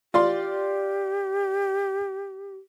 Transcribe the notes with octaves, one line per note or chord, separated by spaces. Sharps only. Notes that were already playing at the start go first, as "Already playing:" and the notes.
F4 G4 D5 C6